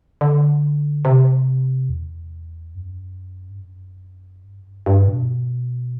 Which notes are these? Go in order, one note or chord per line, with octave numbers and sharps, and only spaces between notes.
D3
C3
E2
F#2
G2
F#2
G2
F#2
G2
G2
B2